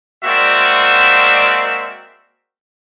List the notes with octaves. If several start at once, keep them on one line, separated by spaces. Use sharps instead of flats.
G#3 A#3 C4 F#4 D5 E5